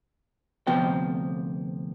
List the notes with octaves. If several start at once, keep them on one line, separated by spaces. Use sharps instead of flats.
D2 C3 F3 B3 G5